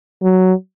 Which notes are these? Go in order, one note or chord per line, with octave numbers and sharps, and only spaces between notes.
F#3